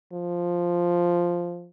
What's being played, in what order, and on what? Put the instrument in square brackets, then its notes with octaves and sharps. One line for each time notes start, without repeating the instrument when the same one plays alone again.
[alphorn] F3